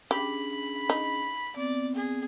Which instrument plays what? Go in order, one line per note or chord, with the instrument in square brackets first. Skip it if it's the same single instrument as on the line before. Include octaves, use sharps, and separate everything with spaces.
[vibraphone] C#4 D4 G#4 [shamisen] G4 [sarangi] B5
[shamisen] D#4
[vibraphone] B3 C4 [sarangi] D5
[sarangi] G#4